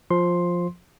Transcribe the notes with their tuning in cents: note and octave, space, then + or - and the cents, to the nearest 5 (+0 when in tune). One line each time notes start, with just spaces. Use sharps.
F3 +10 C6 +5